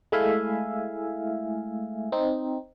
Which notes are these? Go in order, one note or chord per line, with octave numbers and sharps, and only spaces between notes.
G#3 A3 E4 E5 F5 G#5
C4 D#4